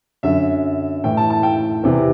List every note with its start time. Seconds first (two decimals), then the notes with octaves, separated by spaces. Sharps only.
0.23 F#2 D3 E5
1.04 A2 E3 G5
1.17 A5
1.30 A5
1.43 G5
1.83 E2 C3 E3